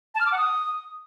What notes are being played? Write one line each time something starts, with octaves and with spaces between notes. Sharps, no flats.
A5
F6
D6
F#5
D#6